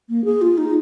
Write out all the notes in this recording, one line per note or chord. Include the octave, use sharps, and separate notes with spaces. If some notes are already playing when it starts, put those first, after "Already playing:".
A#3
G#4
F4
D#4